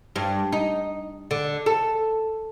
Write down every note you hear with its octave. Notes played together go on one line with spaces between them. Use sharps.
G2
D#4
D3
A4